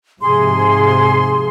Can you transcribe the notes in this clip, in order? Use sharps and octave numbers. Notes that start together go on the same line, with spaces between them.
G#2 C3 F3 G#4 C6